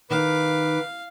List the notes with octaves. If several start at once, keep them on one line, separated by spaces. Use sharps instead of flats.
D#3 B4 F5 D6